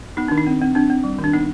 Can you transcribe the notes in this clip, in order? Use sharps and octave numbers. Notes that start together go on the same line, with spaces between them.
B3 D#4
D#3 D4
D#4
C4
C4
C4 D4
C4
G3
D#3
D4
B3 D#4